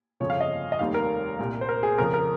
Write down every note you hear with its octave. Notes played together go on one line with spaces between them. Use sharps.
G1 F2 C#3 F3 C#5
F5
D#5
D#5
F1 D#2 D#3 G3 F5
A#4
C2 A#2 G3
C5
A#4
G#4
F2 C#3 F3 A#4
A#4